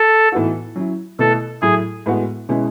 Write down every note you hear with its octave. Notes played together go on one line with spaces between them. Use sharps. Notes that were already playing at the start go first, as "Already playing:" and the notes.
Already playing: A4
A2 E3 B3 D#4 F#4
F#3 C#4 E4
B2 A3 E4 A4
A2 F#3 A3 E4 G#4
A2 G#3 B3 F#4
B2 G#3 C#4 E4